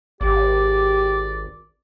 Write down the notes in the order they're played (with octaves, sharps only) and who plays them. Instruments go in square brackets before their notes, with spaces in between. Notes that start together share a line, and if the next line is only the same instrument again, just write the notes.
[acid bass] G#1 [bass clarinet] G4 [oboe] D5